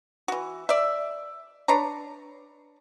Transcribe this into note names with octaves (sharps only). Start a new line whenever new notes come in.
E3 F#4
D5 E5
D4 B4 C#5 A#5